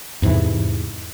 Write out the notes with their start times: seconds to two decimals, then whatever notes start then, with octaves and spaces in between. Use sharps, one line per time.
0.22 E2 G#2 C3 E3